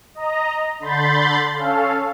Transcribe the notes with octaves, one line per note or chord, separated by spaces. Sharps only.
D#5 A#5
D3 B5 C6 G6 A6
C#4 A4 F5